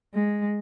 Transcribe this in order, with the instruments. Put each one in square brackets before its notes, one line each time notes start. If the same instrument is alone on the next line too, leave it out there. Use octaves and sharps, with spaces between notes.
[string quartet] G#3